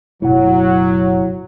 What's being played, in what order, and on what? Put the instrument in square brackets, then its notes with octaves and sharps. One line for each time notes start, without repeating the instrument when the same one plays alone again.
[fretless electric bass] F#1 B2 A3 [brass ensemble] F#3 [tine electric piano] E4 F#5